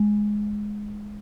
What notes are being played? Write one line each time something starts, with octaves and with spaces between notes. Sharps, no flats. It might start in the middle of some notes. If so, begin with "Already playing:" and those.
Already playing: G#3